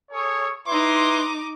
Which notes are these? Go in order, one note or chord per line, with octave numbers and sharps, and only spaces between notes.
G#4 A4 C#5
D#4 E4 B4 C6 D6